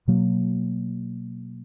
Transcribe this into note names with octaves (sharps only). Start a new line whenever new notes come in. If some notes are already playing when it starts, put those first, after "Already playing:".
B2 F#3 A#3